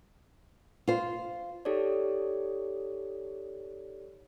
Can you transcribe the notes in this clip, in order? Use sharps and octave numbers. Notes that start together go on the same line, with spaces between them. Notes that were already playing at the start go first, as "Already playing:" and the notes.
F4 C5
D#4 G4 A4 C#5 D5